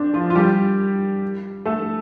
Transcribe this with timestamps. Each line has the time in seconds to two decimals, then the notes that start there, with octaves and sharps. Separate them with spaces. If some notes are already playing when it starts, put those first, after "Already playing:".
Already playing: C4 D4
0.14 F3 F4
0.30 F4
0.35 G3 G4
1.65 A3 A4